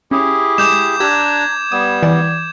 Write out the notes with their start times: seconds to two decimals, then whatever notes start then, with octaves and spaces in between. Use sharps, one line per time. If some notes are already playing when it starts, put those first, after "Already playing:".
0.11 C#4 E4 G4 G#4
0.58 G#3 D6 G6 E7
1.00 D4 G4 A#5 E6 F#6 G#6 B6
1.72 G3 B3 D#6
2.03 E3 D5 E7